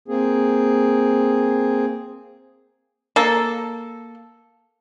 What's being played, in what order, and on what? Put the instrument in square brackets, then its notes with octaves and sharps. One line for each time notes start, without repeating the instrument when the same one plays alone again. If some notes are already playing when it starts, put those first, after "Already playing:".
[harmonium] A#3 C4 G#4
[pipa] A#3 A4